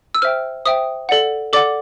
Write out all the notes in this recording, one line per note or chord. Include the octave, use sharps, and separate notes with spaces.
E6
C5 E5 G5 F6
C5 E5 G5 D#6
A4 D5 F#5
A4 D5 F#5 D6